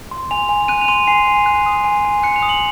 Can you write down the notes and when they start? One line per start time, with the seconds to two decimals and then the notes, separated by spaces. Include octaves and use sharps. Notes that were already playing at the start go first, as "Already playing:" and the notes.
0.11 C6
0.31 G#5 F7
0.49 G#5
0.68 F#6 D#7
0.81 F7
0.88 C6 D#7
1.08 G#5 C7
1.27 G#5
1.46 F#6
1.66 D#6
1.84 G#5
2.05 G#5
2.23 F#6 C#7
2.36 F7
2.43 D#6
2.49 F#7